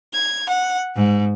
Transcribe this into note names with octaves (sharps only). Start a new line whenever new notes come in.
G#6
F#5
G#2